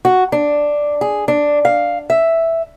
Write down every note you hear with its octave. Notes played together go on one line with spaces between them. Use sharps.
F#4
D4
G#4
D4
F5
E5